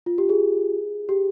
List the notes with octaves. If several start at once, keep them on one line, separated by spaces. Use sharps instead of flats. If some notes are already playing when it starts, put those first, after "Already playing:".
F4
G4
G#4
G4